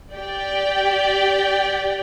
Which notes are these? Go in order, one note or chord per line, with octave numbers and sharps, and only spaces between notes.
G4 D5 G5